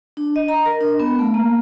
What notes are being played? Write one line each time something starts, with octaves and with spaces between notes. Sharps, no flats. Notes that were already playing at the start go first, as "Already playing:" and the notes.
D4
D#5
A#5
A#4
D4
B3
A3
A#3